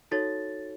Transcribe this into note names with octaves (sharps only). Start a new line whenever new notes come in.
D#4 F#4 A4 C#5 A6